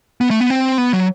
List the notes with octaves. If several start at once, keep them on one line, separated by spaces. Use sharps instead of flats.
B3
A3
B3
C4
B3
F#3